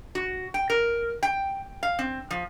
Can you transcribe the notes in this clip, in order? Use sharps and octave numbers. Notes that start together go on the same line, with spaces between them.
F#4
G5
A#4
G5
F5
C4
F3